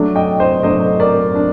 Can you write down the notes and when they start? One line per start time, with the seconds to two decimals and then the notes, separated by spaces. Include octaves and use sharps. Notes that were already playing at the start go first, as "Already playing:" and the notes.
Already playing: F#3 A3 D4
0.15 D#5 G5
0.40 C5 D#5
0.63 F#3 A3 D4 C5 D#5
1.00 A#4 D5
1.35 D4